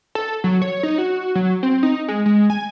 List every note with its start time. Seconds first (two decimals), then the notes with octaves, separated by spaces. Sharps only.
0.15 A4
0.44 F#3
0.62 C#5
0.83 D#4
0.98 F#4
1.35 F#3
1.63 C4
1.83 D#4
2.08 G#3
2.26 G#3
2.50 G#5